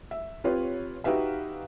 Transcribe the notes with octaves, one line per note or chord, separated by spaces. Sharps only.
E5
C4 F4 G4 B4 C#5
D#4 F#4 G4 B4 E5 F5